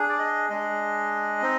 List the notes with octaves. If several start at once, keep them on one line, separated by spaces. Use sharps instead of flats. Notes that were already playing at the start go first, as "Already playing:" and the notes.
Already playing: D4 G#4
D5
D#5
G#3 D4 G#4 D#5
C4 D#4